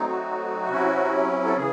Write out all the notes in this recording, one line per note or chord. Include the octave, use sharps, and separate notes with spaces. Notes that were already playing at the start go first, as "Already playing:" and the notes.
Already playing: F#3 A3 C4 D#4
F#4
C3 F#3 C#4 E4
A4
C#3 E3 G#4